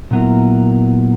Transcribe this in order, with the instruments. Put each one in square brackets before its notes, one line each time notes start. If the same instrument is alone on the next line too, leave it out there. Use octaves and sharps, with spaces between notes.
[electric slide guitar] A#2 F#3 B3 E4 A#4